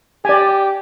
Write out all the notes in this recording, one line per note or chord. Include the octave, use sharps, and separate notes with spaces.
G4 D5 G#5